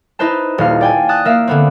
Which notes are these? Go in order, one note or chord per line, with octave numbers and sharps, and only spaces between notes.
D#4 E4 B4 C5 A5
D#1 F5
D5 G5 G#5
A5 D#6 F#6 A6
A#3 E5 F5
D3 B3 C4